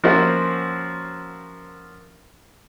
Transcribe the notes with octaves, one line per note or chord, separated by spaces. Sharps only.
F3 A#3 C#4 E4 F#4 C5